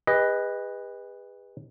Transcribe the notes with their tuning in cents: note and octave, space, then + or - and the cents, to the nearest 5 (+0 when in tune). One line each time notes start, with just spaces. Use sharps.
G#4 -45 B4 +0 D#5 +0